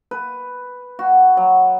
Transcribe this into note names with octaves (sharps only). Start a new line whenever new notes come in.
B4
F#4
F#3